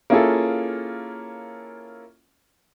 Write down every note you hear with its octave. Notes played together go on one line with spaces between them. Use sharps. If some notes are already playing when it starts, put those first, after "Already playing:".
A#3 C#4 E4 F4 G#4 A4